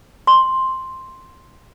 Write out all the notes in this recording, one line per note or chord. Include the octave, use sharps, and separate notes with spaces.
C6